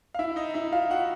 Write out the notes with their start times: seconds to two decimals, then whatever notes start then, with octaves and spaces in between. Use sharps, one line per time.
0.14 F5
0.19 E4 E5
0.36 D#4 D#5
0.54 E4 E5
0.72 F4 F5
0.90 F#4 F#5